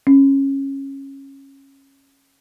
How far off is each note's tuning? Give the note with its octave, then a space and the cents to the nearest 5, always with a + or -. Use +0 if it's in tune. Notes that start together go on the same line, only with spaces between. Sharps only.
C#4 -15